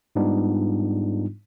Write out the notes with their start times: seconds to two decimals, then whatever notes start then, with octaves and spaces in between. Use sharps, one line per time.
0.16 G#2 G3 B3 D4 D#4 F4